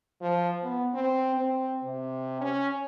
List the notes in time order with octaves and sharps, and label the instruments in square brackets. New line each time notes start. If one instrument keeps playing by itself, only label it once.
[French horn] F3
B3
C4
C4
C3
C#4